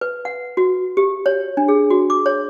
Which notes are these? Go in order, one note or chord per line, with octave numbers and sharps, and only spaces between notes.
B4
F#5
F#4
G4
C#5
D4
G#4
F#4
D6
C#5